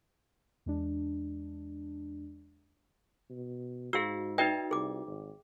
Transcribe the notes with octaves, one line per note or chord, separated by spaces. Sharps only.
E2 G#3 D4
B2
G#2 F#4 G#4 F5 E6
D#4 F#4 B4 D5 E5 G5
C2 G#4 D6
G#1